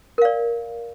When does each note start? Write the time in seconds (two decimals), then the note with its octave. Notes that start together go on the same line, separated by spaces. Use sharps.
0.18 A#4
0.22 F5
0.25 D5